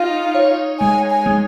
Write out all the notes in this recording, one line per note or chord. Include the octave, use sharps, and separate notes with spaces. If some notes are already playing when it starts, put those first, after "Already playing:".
Already playing: D#4 F4
C#5
G#3 G#5
G#5
G#3